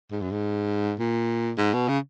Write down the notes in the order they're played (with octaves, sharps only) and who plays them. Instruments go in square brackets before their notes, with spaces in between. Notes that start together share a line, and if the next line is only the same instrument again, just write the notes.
[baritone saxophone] G#2
F#2
G#2
A#2
G#2
B2
C#3